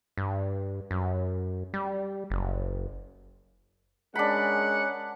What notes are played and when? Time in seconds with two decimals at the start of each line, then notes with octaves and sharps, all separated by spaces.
0.17 G2
0.91 F#2
1.74 G3
2.30 F#1
4.15 G#3 C#4 D4 A#4 F#5 B5